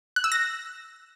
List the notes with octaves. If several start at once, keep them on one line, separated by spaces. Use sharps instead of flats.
F#6
E6
A#6